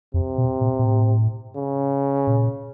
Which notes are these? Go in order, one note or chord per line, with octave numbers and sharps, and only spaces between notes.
F2 C3
B2
A#2
A#2
A2
C#3
A#2